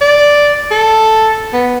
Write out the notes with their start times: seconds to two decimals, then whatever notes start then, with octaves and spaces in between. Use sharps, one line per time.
0.01 D5
0.71 A4
1.53 B3